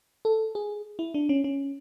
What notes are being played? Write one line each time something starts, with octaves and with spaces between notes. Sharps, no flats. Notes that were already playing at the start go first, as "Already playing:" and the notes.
A4
G#4
E4
D4
C#4
C#4